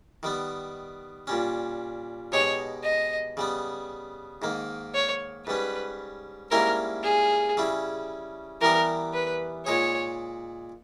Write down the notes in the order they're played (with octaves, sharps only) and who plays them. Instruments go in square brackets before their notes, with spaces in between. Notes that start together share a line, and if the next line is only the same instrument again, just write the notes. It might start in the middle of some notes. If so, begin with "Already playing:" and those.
[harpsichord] D#3 G3 B3
A#2 G3 C#4
[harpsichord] B2 G#3 D#4 G4 [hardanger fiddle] C#5
[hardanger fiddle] D#5
[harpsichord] C#3 G3 B3
G#2 D#3 A#3
[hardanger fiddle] C#5
[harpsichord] G#2 G3 C#4 [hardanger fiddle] B4
[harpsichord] G#2 G3 A#3 C#4 E4 [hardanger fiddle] A#4
[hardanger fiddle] G#4
[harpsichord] C#3 G3 C#4 E4
[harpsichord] E3 G3 B3 G4 [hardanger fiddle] A#4
[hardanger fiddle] B4
[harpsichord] A#2 G#3 D#4 G#4 [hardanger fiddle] C#5